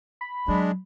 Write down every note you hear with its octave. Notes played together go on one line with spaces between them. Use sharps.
B5
F#3 G#3 D4